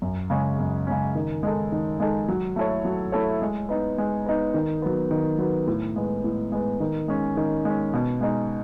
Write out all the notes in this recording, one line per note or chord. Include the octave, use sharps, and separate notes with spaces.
F#2
C#3 G#3 C#4
F#2
C#3 G#3 C#4
D#3
G#3 D#4 A4
D#3
G#3 D#4 A4
F#3
A3 E4 A4 C#5
F#3
A3 E4 A4 C#5
G#3
B3 D#4
G#3
B3 D#4
D#3
F#3 B3
D#3
F#3 B3
A2
G#3 B3
A2
G#3 B3
D#3
G#3 C#4
D#3
G#3 C#4
B2
G#3 D#4